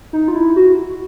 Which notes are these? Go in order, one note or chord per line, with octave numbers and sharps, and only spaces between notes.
D#4
F4
E4
F#4